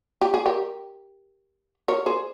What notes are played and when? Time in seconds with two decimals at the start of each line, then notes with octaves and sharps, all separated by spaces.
0.21 G4
0.34 G#4
0.46 G4 A#4
1.88 A#4 C#5
2.06 G#4 C5